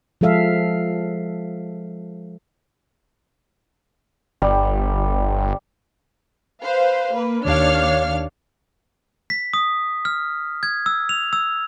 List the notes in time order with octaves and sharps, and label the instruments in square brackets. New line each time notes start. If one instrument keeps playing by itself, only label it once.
[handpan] F3 G#3 A4 E5 F5
[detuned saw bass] G1 [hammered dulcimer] G3
[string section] B4 C5 F5
A#3 B4
D#2 D4 C#5 F5 F6
[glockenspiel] B6
D#6
F6
G#6
E6
F7
E6